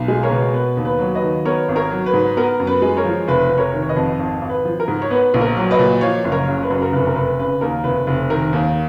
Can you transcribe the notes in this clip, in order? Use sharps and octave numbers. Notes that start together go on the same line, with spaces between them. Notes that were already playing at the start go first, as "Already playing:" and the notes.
Already playing: B1
G#3
A#4 C#5
B2
B3 B4
D#2
B4
F#3
B4 D#5
D#3
B3 A#4 C#5
G#1
A#4 C#5
F#3
B4
G#2
B3 A#4
F#2
B4
G#3
A#4 C#5
F3
F1 B4
F1 B4
A#4 C#5
D#3
C#5
B4 D#5
F2
G#1
G#1
B4
F3
A#4
G#2
C#5
B3 B4
A#1
A#4
F#3
B4 D#5
A#2
F3 C#5 F5
F#1
A#4 C#5
C#3
B4
F#2
A#4
F1 B4
A#4
F1 B4
C#3 B4
D#2 A#4
F1 B4
F1
D#3 A#4
D#2